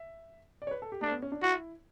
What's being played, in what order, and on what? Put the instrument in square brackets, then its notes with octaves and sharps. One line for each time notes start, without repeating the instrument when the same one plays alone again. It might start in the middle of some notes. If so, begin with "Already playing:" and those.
Already playing: [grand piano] E5
D5
C#5
B4
A4
G4
[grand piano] A3 [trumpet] D4
[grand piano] B3
C#4
D4
[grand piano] E4 [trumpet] F#4